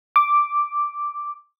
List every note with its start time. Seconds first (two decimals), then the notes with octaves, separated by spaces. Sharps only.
0.16 D6